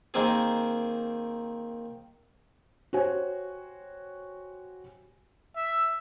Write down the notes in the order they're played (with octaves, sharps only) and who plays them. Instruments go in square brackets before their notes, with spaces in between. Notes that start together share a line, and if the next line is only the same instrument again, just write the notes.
[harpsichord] D#3 A#3 C4 G#4
[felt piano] F#4 G4 C5 C#5 G#5
[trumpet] E5